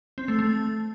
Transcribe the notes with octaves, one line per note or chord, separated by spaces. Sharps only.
C4
A3
A3